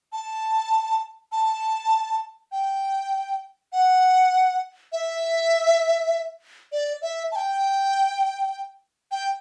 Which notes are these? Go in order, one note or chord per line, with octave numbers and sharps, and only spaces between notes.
A5
A5
G5
F#5
E5
D5
E5
A5
G5
G5